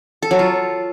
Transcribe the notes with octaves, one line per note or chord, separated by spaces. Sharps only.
A4
F#3
F4